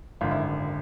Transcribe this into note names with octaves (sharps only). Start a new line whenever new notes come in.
G#1 F#2 D3 F4
E4